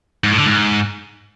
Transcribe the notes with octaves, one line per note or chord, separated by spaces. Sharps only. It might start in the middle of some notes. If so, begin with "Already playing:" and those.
G#2
A2
D3
G#2